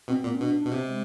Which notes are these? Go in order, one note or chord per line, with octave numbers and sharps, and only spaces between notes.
B2 C4
A#2 B3
C#4
B2 D4
B2 D4
C3
G#3